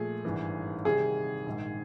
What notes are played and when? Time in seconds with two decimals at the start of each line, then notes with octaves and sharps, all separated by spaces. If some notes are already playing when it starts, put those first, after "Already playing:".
Already playing: A#2 F3 A3 G#4
0.25 G#1 G2 E3
0.85 C3 D#3 G3 G#4
1.47 A#1 G#2 D#3